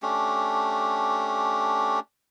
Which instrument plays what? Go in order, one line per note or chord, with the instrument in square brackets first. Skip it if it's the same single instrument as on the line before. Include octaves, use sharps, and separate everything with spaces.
[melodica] A3 C#4 D4 G4